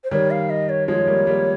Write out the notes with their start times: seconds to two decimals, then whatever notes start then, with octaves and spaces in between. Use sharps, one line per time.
0.04 C5
0.11 D#3 G3 C#5
0.31 F5
0.50 D#5
0.69 C#5
0.88 F3 G#3 C#5
1.07 G3 A#3
1.27 G3 A#3